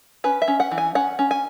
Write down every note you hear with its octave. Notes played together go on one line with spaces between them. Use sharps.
C#4 B4
E5
C#4
F#5
E3
G#5
C#4 F#5
C#4
G#5